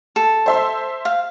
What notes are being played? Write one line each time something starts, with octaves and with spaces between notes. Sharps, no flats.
A4
C5 E5 C6
F5